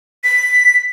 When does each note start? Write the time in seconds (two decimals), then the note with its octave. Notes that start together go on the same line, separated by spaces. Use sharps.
0.24 B6